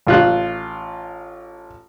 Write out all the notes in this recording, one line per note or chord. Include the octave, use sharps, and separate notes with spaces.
A1 F4 F#6